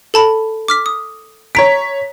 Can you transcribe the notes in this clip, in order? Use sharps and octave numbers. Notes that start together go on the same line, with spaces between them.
A4 A5 B5
D6 F6 B6
D#6
C#5 A#5 B6 D7